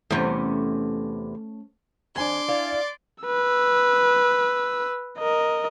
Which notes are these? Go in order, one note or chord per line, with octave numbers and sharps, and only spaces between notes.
E2 C3 A3 C#4 C#5
F2 D4 G#5 C6 D6 G#6
E4 D5 F5
B4 E6
A#4 D#5